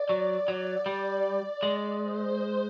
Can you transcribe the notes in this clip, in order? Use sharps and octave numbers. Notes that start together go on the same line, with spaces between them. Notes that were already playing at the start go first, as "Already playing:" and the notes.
Already playing: D5
F#3
F#3
G3
G#3
C5